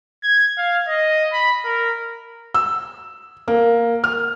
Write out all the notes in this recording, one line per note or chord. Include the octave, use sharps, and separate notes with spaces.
G#6
F5
D#5
B5
A#4
E6
A#3
F6